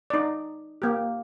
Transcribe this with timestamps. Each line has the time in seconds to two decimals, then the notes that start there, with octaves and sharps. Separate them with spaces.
0.10 D#4 D5
0.82 A#3 G4